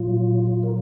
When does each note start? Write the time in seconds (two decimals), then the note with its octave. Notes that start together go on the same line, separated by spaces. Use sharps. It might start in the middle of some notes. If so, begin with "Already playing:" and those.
Already playing: A#2 F#3 F4
0.47 F4
0.63 A#4